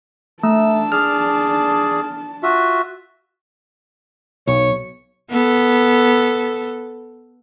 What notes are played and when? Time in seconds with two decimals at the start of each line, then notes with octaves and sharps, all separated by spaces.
0.43 A3 D4 A5 E6
0.92 G#4 D5 F6
2.43 F4 F#4 E5
4.47 B1 C#5
5.31 B3 A4